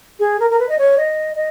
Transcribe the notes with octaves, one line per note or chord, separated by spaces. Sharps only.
G#4
A#4
A#4
B4
D#5
C#5
D#5
D#5